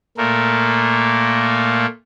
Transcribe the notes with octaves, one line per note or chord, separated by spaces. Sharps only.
A#2 A3 A#3